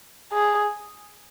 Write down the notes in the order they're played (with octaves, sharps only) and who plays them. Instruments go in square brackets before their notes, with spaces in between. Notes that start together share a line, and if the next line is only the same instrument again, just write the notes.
[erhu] G#4